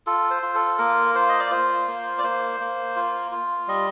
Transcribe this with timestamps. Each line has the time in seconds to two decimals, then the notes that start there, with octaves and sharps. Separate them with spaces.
0.07 F4 A4
0.30 C5
0.43 F4
0.55 A4
0.78 A#3 A#4
1.15 F4 C5
1.29 D#5
1.40 D5
1.51 F4 C5
1.88 A#3
2.18 D5
2.23 A#3 C5
2.60 A#3
2.96 F4
3.31 F4
3.68 G3 D#5